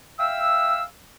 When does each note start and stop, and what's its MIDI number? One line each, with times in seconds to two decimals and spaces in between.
0.20 0.83 76
0.20 0.83 77
0.20 0.83 79
0.20 0.83 88